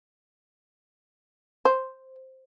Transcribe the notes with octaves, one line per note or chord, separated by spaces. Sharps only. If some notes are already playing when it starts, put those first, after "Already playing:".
C5